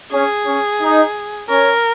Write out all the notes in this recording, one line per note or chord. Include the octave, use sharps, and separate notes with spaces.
C#4 G#4
C#4
D#4
C#4 A#4